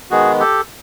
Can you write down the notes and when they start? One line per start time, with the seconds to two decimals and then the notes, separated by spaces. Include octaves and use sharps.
0.11 D#3 G#3 B3 F#4 G#4
0.40 G4 A4